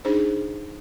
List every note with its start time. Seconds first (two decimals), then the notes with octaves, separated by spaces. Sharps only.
0.05 D4 D#4 G#4 C5